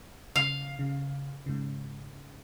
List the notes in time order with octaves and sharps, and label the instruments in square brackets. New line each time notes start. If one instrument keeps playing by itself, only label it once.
[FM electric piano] C#3 [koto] F5
[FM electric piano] C#3
G#2 C#3